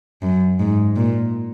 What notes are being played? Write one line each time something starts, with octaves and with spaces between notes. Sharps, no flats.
F#2
G#2
A#2